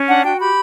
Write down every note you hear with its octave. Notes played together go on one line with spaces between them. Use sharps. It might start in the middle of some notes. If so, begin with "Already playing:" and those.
Already playing: C#4
D4 F#5
F#4 G5
G4 B5